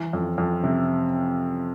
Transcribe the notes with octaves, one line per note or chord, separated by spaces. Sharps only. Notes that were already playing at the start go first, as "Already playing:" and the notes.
Already playing: E3
F2
F2
C3